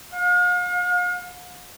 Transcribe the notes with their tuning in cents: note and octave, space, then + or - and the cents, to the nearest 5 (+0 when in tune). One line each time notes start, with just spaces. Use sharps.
F5 +45